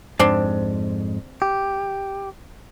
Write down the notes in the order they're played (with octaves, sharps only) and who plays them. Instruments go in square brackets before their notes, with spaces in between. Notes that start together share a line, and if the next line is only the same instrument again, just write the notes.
[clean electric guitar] F2 G#2 [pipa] C4 D4
[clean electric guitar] G4